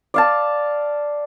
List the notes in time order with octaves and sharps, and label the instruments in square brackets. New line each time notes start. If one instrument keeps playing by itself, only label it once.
[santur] D5 F5 A5